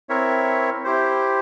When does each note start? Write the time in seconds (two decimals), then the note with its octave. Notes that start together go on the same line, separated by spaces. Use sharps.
0.09 C4 E4 A#4 C#5 E5
0.84 E4 G4 C5